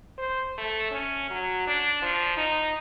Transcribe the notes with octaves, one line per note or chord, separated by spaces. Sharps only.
C5
A3
C#4
F#3
D4
F3
D#4